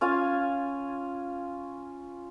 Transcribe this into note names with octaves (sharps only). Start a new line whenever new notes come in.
C#4 F4 F5 G#5